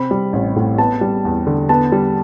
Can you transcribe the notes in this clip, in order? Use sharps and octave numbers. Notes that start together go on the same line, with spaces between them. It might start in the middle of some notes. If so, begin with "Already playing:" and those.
Already playing: C3 C4 B5
G3
A1
A2
B3 A5
G3
E2
D3
B3 A5
G3